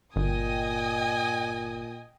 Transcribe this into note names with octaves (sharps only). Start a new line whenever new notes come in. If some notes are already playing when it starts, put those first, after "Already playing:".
G1 A#2 D#5 G5 G#5 D#6